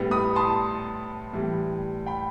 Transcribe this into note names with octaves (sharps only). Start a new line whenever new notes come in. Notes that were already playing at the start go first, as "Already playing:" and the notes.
Already playing: A2 G3 B3
B5 D#6
A5 C6
A2 E3 G3
G5 B5